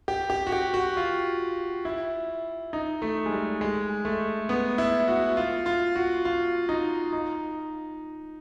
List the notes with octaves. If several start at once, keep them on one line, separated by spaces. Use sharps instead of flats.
G4
G4
F#4
G4
F#4
F4
E4
D#4
A3
G#3
G3
G#3
A3
B3
E4
F#4
F4
F4
F#4
F4
D#4
D#4